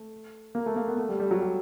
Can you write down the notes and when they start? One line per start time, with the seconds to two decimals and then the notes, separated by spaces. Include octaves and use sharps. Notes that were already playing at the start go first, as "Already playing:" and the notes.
Already playing: A3
0.55 A#3
0.66 A3
0.76 A#3
0.88 B3
0.98 A3
1.09 G3
1.20 G3
1.31 F#3
1.42 G3